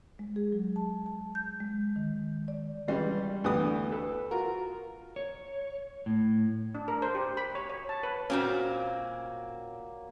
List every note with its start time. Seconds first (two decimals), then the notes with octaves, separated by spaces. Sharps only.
0.19 G#3
0.36 G#4
0.52 F#3
0.76 A5
1.06 A5
1.35 G6
1.60 G#3
1.96 D#3
2.48 D5
2.88 C#3 E3 G3 G#3
3.44 D2 E3 B3 G4 B4 D#6
3.92 A4 B4
4.31 F4 F#4 A#4
5.16 C#5
6.06 A2
6.75 D4
6.88 A#4
7.02 C5
7.15 G4
7.37 B5
7.55 C#5
7.70 C#5
7.89 A5
8.03 B4
8.30 A#2 A#3 C4 C#4 F#4